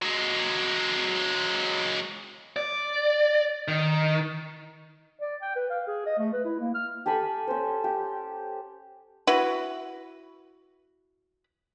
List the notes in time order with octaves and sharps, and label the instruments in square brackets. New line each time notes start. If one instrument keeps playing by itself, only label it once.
[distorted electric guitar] F#3 G#3
[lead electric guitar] D5
D#3
[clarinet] D5
G5
B4
F5
G#4
D#5
A3
B4
E4
A#3
F6
[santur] G4 A4 G#5 B5
C#4 C5
G4
[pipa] E4 F#4 B4 B5